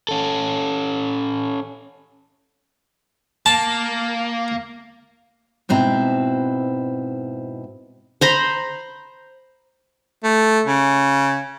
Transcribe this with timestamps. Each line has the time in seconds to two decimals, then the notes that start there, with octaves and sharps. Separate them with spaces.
0.09 C#4 A4
3.46 A#3 A5
5.69 G#2 B2 C4 E4 A#5
8.21 C5 A#5 B5
10.24 A3
10.66 C#3